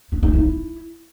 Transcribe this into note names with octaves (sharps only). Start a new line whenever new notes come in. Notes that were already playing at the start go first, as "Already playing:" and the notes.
D4
D#4
E4